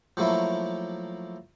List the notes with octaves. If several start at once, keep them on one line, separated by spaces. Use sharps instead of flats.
F3 F#3 A3 A#3 E4